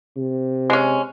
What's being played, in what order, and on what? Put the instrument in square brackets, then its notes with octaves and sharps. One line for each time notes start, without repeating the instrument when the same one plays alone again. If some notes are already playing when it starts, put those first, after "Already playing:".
[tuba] C3
[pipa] G#3 C#4